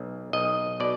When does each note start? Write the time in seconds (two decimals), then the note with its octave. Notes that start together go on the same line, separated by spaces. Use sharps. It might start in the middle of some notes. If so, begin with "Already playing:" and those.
Already playing: B1
0.33 B1 D#5
0.80 B2 D5